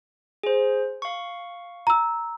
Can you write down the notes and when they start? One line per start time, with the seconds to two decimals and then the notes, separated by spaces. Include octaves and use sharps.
0.43 G#4 C5
1.02 F5 C#6
1.87 A#5 E6